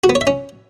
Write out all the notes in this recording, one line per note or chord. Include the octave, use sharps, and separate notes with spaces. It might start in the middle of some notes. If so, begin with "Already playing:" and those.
F#4
B3
C#5
E5
C#4